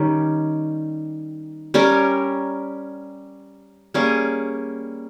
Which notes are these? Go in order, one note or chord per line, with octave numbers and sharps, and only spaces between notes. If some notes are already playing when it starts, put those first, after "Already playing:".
Already playing: D#3 G3 C#4 G4
G3 C#4 G4 A#4
G3 A#3 C#4 G#4